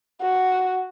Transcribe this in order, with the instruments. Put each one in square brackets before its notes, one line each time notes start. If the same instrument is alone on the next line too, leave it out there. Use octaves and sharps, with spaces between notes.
[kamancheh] F#4